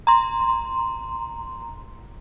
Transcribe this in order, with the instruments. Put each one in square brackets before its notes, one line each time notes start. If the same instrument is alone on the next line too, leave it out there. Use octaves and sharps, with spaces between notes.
[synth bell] A#5 C6